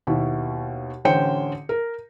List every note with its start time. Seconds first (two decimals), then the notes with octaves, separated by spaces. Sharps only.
0.07 D#2 B2 E4
1.05 A1 D3 C#4 C5 G5 C#7
1.69 A#4